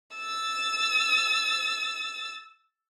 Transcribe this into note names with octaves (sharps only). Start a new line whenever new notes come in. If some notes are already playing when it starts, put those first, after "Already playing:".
E6 A6